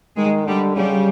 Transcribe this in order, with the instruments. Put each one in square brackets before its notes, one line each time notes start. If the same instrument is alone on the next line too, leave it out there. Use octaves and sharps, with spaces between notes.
[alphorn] D#3 [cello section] G#3
[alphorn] D3 [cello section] G3
[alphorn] C#3 [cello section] G3